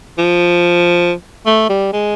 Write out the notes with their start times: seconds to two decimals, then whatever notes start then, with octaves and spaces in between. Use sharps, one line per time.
0.18 F3
1.46 A3
1.69 G3
1.93 G#3